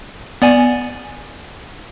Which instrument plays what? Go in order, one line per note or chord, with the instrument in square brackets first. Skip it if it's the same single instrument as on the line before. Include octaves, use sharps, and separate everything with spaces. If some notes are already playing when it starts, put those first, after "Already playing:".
[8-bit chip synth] B3 D5 G#5